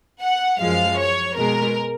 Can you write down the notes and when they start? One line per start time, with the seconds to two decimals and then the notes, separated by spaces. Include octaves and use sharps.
0.21 F#5
0.60 F#2 F3 G#3 F5
0.99 C#5
1.37 B2 G#3 A#4